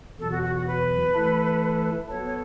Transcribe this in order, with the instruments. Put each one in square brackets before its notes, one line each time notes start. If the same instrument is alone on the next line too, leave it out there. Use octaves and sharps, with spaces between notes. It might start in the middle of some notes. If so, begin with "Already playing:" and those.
[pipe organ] E2 B2 F#3 [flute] A4
[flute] F#4
F#4
F#4
B4
[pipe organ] E3 A3 E4 A4
[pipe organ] F#3 B3 A4 [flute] C#5
[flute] C#5